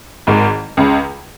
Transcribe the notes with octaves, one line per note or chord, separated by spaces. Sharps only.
G#1 G#2 D#3
C#2 C#3